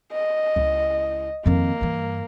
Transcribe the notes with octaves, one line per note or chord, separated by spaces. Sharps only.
D#5
C#2 E4
F2 D#3 A#3
G2 E3